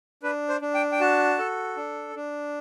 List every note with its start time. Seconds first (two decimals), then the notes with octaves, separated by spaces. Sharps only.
0.23 D4 B4
0.49 C5
0.62 D4
0.74 G5
0.92 G5
1.00 F#4 A5
1.38 A4
1.77 D4
2.16 D4